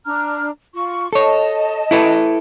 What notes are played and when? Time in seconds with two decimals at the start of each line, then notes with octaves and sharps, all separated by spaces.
0.05 D4 A#5 F6
0.74 F4 C#6
1.13 A4 C#5 D#5 A5
1.91 E4 A4 B4